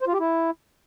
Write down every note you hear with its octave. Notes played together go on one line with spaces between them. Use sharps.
C5
F4
G4
E4